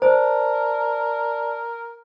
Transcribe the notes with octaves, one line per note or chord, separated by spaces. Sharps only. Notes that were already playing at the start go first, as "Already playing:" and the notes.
A#4 C5 D5 A5